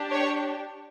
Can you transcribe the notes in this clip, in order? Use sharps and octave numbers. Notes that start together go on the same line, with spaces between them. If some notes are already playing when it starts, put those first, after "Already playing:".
Already playing: D4 G4
C#5